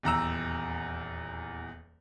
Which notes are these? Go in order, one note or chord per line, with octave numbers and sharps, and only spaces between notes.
D#1 E2 A#5 E6